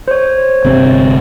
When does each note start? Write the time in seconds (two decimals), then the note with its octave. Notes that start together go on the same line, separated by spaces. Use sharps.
0.08 C5 C#5
0.64 G1 C3 C4